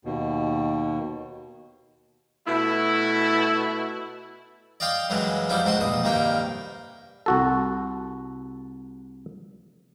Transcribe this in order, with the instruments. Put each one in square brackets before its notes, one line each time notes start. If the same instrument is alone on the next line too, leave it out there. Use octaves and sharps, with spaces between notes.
[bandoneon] D#2 B2
[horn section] B2 A3 E4
[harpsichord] D5 D#5 F5 G5 C6 D6
F#2 C#3 E3 F#3 G#3
F3 G3 B3 D#4 E4 G4
C#2 G#2 C4 F#4 C6
A#1 B2 D#6
C2 G2 D#3 A#3 G5
[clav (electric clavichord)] C2 F#4 A4